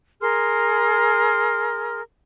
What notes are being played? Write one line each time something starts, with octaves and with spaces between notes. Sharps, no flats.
G#4 A#4 C6 F6